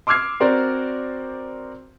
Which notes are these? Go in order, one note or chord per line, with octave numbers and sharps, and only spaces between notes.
C6 D6 E6 F6 G#6 C7
C4 F#4 A#4 C5 D5